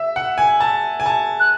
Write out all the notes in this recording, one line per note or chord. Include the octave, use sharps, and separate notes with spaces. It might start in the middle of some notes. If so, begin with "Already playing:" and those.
Already playing: E5
F#5
G#5
A5
G#5
A5
F#6